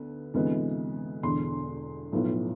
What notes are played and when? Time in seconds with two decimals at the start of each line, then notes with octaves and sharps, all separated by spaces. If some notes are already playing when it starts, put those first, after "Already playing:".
Already playing: D2 D3 B3
0.34 D2 C3 E3 G#3 B3
1.23 E1 E2 D3 C6
2.13 B1 A2 F3 B3